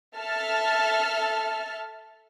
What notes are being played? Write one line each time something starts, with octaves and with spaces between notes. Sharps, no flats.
A4 E5 A5 F6